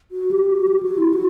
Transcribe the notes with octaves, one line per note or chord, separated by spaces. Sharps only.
F#4
G4
F#4
G4
F#4
E4
F#4